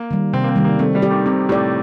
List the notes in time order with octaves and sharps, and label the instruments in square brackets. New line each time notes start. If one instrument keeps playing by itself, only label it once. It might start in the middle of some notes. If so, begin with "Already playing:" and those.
Already playing: [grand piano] A#3
[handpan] D#3 G3
[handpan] C3 [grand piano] C4
[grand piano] A#3
C4
[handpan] D#3 G3
[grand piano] A#3
[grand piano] A3 [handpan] C4
[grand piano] G3
[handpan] G4 D5
[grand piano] D#3
[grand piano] C3 [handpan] C4
[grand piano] A2 [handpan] G4 D5